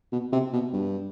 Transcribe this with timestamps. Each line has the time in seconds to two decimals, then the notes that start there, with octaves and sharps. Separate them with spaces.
0.12 B2
0.32 C3
0.53 B2
0.73 G2